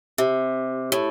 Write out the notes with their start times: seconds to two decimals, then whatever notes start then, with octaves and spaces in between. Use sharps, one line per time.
0.18 C3
0.92 A2